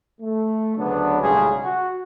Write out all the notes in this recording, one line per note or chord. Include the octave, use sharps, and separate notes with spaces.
A3
D2 C#3 F#3 B3 D4
B1 A2 C#3 G3 G#3 G#4
F#4